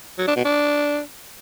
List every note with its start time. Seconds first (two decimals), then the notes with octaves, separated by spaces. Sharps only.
0.18 F#3
0.27 D4
0.36 B2
0.45 D4